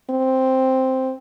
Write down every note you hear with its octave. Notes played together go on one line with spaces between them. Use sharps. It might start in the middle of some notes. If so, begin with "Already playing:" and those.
C4